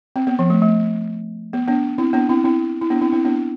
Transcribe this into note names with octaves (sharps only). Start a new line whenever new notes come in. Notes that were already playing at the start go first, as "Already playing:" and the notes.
C4
B3
F3
A3
A3
B3
B3 D4
C4 E4
B3 D4
C4 E4
C4 E4
E4
B3 D4
C4 E4
C4 E4
B3 D4